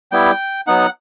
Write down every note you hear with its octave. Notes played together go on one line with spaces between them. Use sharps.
G3 B3 E4 G5
F#3 B3 D#4 F#5